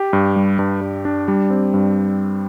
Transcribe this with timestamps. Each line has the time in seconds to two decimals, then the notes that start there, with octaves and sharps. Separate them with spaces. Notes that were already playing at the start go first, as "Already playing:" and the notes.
Already playing: G4
0.13 G2
0.36 G3
0.59 G2
0.81 G2
1.05 D4
1.28 G3
1.50 C4
1.74 G2